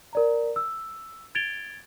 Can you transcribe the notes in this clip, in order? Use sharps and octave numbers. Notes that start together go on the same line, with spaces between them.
A#4 D5 A#5
E6
G#6 A6 D7 F7 G7